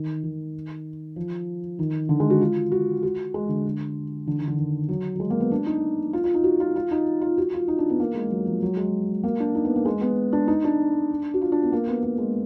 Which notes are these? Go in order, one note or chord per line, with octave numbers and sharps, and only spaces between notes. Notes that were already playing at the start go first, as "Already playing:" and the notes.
Already playing: D#3
D#3
F3
D#3
D3
G#3
F#4
F4
F#4
F#4
G#3
D3
D3
D#3
D3
D#3
F#3
F#3
G#3
A#3
B3
D4
D#4
F4
F4
D#4
F#4
F4
F4
D#4
F4
F#4
F4
D#4
D4
B3
A#3
G#3
F#3
F3
F#3
G#3
A#3
D4
D#4
B3
A#3
G#3
B3
D4
D#4
D4
F#4
F4
D4
B3
A#3
B3
A#3
G#3